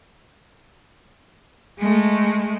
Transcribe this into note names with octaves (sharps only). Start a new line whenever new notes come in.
G#3 A3